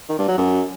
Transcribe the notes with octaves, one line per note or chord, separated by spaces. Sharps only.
D#3
G2
F#3
F#2